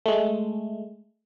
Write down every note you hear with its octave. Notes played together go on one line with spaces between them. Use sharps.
G#3 A3